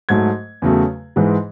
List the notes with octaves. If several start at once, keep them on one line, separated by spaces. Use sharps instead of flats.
G#2 F#3 A3 G#6
E2 C#3 F#3 A3
G#2 E3 G#3